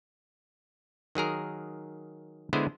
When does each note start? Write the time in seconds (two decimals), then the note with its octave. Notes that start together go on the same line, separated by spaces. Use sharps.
1.15 D#3 F#3 G#4 A#4
2.53 D3 G#3 B3 E4 G#4 C5